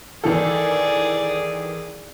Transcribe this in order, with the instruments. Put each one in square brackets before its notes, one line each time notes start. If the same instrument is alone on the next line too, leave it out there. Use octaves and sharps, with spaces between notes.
[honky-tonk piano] D#3 E3 A4 [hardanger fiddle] G#4 D5